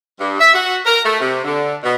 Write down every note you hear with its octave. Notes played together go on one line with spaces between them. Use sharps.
G2
E5
F#4
A#4
A3
C3
D3
B2